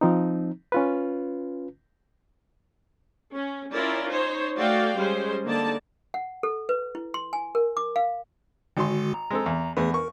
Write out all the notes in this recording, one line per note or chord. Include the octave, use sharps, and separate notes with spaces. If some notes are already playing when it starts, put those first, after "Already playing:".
F3 C4 D#4
C#4 F4 B4
C#4
C#4 E4 F4 A#4 D5
D#4 C5 C#5
A3 F#4 A4 D5 F5 G5
G3 G#3 C#4 C5
D3 A#3 D#4 D5 A5
F#5
A4
B4
E4
C6
G#5
A#4
D6
F5
G#1 D3 G#3 F#4 C6
A#5
G#3 C4 A4
E2
E2 A3 B3 G#4
A#4 C#6